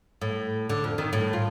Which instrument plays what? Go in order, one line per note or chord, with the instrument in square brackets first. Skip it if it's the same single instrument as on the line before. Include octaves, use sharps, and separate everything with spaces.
[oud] A2
D3
F2
D#3
A2
F4